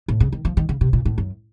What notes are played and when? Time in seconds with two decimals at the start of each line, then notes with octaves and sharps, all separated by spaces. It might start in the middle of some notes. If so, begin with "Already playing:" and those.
0.08 A2
0.20 C#3
0.33 D#3
0.45 F3
0.57 D#3
0.69 C#3
0.81 C3
0.93 A#2
1.05 A2
1.18 F#2